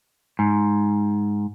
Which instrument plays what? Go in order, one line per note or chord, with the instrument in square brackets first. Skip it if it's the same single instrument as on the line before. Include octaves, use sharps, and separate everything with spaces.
[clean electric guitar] G#2